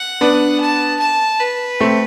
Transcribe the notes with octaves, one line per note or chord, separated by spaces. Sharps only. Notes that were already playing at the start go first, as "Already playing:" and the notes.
Already playing: F#5
B3 D4
A5
A5
B4
A3 C4